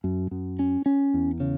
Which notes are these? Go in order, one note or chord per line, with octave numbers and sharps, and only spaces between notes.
F#2
F#2
C#4
C#4
E2
C#3